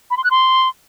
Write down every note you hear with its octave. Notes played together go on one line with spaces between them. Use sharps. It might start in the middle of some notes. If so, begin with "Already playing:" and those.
B5
C6
F#6
C6